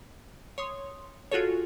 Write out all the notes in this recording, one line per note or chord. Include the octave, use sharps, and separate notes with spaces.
C#5 C6 D#6
F4 F#4 G#4 A4 C#5